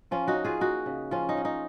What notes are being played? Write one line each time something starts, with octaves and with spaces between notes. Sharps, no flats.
F3 C#4 F4
D#4 F#4
C#4
F4 G#4
A#3 D#4 F#4
C#3
F3 C#4 F4
D#4
C#4
D#4